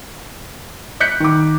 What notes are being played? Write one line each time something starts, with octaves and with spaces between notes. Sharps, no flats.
F#6 G6 B6 C#7
D#3 D6